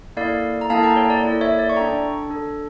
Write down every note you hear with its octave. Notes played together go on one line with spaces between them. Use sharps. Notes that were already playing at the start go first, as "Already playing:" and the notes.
A#3 E4 A4 D5 F5
A#5
A#3 E4 A4 F5 A5
G5 A#5
C#5
D5
A#3 E4 A4 D5
C#5 E5
D5
C#6
D4 A4 G5 A#5
D4 A4